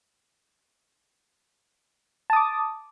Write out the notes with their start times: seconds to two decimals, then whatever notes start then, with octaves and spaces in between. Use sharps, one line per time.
2.30 A5
2.33 D#6
2.36 D6